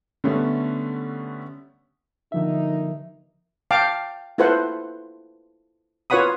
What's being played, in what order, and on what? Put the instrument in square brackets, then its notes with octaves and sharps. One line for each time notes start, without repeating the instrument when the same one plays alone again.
[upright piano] D3 G3 A3 B3 C#4
[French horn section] G2 A#3 D#4 [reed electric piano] D3 F3 E5
[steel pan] F5 G5 A5 D6
E4 F4 A4 B4 C5 F#5
F4 B4 C#5 F#5 B5 D#6